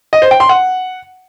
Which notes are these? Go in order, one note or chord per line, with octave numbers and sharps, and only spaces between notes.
D#5
C5
G5
C6
F#5